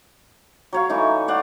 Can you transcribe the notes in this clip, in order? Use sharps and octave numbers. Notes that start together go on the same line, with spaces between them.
F#3 C#5 F5
E3 A3 D#4
D5 F5 F#5